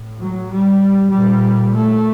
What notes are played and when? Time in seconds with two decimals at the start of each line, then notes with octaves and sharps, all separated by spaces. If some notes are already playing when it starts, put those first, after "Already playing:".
Already playing: A2
0.20 F#3
0.51 G3
1.12 A#2 G3
1.74 A3